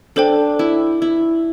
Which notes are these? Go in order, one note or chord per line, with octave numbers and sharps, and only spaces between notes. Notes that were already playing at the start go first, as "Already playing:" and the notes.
D4 A4 C5 G5
E4
E4